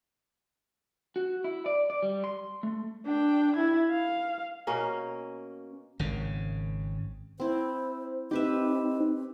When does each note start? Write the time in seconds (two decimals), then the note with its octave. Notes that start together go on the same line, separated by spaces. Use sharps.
1.16 F#4
1.44 E4
1.66 D5
1.90 D5
2.02 G3
2.24 C6
2.63 A3
3.06 D4 G5
3.56 E4 G#6
3.91 F5
4.67 B2 A#3 C#4 A#4
5.99 G#1 C#3
7.40 C4 E4 C5
8.31 C4 D#4 G4 B4 E5